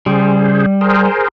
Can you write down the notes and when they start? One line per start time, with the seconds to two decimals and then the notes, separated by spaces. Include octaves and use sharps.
0.06 C#3 G3 G#4 C5
0.81 G#4 A#4 C5